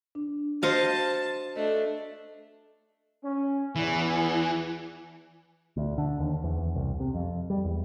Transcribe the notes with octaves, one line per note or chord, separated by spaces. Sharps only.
D4
F#4 C5 D#5 F5 A5
A3 D4 D#5
C#4
E2 E3
D2
D3
D#2
E2
C2
C3
F2
G3
E2